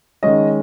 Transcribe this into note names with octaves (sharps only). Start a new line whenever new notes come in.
D#3 G#3 C#4 D#5